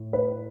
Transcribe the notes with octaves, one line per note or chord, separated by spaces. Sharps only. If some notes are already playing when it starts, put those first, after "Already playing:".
Already playing: A2
B4